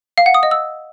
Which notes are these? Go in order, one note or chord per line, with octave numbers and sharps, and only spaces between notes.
F5
F#5
D#6
D#5
E6